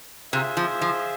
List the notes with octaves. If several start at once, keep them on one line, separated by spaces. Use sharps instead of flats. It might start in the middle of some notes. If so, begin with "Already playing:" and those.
C3 F4 G#4 C5 E5
F3
F3